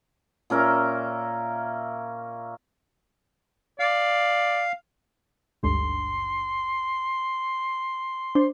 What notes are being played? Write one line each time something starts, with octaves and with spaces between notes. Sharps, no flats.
A#2 C#4 A#4 E5
D5 F5
G#1 D2 G2 C6
D4 C5